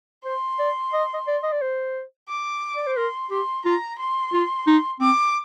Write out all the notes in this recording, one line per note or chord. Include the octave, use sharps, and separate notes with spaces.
C5 C6
D5
D#5
D#5
D5
D#5
D5
C5
D6
D5
C5
A#4 C6
G4 C6
F4 A#5
C6
F4
D#4
C4 D6